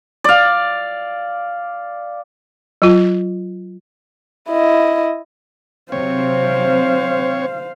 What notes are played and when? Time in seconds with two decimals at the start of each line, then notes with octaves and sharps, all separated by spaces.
0.24 D5 F5
2.82 F#3 F4
4.49 E4 D#5
5.92 C3 F#3 C4 C5 C#5 F5